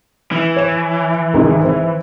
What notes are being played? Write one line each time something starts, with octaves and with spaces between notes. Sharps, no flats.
E3
C#5 E7
C2 G#2 D#3
C4